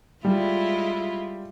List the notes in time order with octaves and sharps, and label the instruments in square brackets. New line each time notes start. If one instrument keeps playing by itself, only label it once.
[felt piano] G3 [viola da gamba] G#3 E4 F4